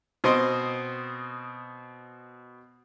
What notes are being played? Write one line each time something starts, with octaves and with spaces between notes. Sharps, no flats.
B2 C4 C5 D#5 C6 D#6